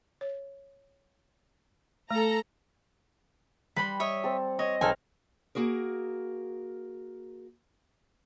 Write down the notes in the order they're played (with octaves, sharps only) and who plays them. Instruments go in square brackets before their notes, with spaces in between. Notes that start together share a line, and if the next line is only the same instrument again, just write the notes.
[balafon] C#5
[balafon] A3 [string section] A4 A#5
[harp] G3 [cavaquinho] B4 B5 C6
[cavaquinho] C#5 D#5 E5
[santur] C4 A4
[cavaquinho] C#5 [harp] D#5
[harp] B1 F6 [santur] C4 F5 [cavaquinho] D#4 A4 G#5
[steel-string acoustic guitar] A#3 F#4 G#4 A#4